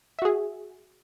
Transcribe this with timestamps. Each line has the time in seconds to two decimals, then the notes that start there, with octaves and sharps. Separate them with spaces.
0.19 E5
0.22 F#4
0.25 G#4